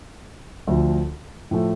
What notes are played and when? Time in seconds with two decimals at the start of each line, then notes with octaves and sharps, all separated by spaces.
0.67 D2 D3 F3
1.51 A2 F3 A3